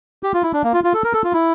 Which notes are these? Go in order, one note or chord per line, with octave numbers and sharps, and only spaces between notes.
G4
F4
E4
D4
A#3
F4
F4
A4
A#4
A4
F4
E4